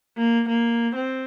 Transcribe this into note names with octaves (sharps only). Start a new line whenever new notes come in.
A#3
A#3
C4